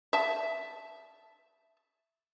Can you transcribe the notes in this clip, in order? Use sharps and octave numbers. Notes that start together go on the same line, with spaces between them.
E5 A5